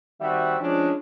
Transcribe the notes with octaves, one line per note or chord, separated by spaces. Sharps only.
D#3 G3 C4 F#4 E5
F3 G#3 C#4 D4